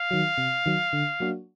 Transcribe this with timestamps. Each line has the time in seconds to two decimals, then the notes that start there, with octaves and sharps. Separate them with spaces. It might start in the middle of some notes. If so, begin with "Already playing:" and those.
Already playing: F5
0.11 D#3 F#3
0.38 C3
0.66 D#3 F#3
0.93 D3
1.20 F#3 A#3 D4 F#4